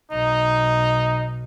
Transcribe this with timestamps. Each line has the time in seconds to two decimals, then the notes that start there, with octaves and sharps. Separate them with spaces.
0.11 B1 D#4